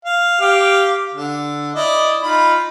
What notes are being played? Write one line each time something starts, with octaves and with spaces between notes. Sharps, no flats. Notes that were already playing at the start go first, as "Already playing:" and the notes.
F5
G4 F5 D6
D3
E4 D5 D#5
D#4 F4 B5